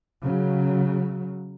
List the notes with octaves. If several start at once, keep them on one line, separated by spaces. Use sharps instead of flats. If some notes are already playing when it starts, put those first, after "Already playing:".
C#3 F#3